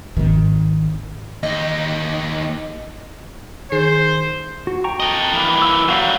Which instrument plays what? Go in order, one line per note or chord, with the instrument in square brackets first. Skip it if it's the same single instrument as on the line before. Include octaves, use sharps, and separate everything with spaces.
[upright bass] G#1 D#3
[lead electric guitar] D#2 D#4 [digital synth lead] D#5
[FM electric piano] D#3 G#4 C7 [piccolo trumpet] C5
[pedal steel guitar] F#4
G5 A#5 C#6
[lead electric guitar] A4 D#5
E3 A#3
[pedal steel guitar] E6
[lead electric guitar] F#3 G3 [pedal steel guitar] F#4 F5 A#5